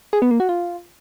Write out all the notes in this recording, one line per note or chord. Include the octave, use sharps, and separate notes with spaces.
G#4
B3
A#3
F#4
F4